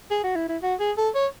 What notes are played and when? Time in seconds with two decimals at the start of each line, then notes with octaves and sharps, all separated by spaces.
0.11 G#4
0.24 F#4
0.36 E4
0.49 E4
0.62 F#4
0.80 G#4
0.97 A4
1.15 C#5